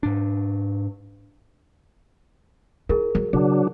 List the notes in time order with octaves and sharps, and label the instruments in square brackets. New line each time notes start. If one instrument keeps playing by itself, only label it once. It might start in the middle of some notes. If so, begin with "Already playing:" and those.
[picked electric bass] G#2 D4
[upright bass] E4 [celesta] G#4 A#4
[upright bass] F#3
[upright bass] C#3 [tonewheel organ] F#3 D4